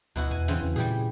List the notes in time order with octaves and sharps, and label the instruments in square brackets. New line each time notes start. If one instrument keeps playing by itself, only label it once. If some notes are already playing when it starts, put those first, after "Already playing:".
[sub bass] D2 [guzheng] B2 E4 F#4
[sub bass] E2 [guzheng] G#5
[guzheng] C#3 E3 C4
[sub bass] E2
[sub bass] A#2 [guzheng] G3 G4 G#4